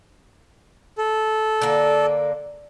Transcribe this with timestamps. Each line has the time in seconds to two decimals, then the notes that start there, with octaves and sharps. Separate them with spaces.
0.98 A4
1.61 D3 A#3